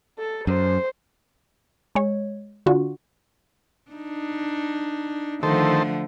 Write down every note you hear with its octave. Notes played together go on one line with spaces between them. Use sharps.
A4
F#2 C5
G#3 C#5
D3 F4 F#4
D4 D#4
D3 D#3 F3 A3 A4 C5